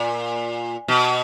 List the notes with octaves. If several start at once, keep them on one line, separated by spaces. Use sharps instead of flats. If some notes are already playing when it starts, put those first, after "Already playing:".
Already playing: A#2
B2